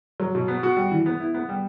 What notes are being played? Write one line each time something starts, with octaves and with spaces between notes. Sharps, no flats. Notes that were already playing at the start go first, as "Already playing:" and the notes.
F#3
B2
B3
F#4
G3
E3
B3
E4
B3
G3